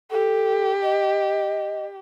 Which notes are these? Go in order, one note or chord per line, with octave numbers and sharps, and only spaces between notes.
G4 A4
D#5